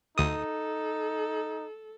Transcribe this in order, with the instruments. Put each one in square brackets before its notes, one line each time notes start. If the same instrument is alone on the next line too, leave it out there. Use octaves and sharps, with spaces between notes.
[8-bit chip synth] D2 D#6 [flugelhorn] D#4 [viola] A4